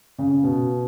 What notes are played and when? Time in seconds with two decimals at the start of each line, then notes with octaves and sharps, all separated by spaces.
0.18 C#3
0.43 B2